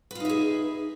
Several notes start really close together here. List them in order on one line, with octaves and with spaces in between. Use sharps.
B4 F4 D#4 E5 G#4